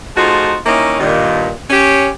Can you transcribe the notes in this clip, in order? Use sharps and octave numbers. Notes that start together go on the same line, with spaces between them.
F3 A3 D#4 F4 F#4 G#4
D#3 A#3 C#4 D#4 E4
G2 A#2 D#3
C#4 G4 C#5